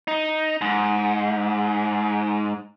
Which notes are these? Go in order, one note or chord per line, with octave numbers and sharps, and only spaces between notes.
D#4
G#2